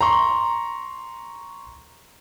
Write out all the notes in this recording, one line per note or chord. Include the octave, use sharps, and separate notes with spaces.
A#5 C6 C#6